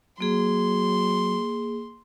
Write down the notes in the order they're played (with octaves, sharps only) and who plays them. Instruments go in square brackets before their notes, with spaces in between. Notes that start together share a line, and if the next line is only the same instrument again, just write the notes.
[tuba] F#3 [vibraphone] A#3 G#4 [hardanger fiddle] C6